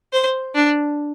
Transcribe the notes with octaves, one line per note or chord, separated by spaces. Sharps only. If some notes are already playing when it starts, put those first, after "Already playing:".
C5
D4